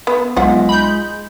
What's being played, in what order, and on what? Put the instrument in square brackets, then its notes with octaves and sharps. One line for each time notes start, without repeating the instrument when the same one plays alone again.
[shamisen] B3
[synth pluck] B1 [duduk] G#3 [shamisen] F4 E5 F#5
[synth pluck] B5 G6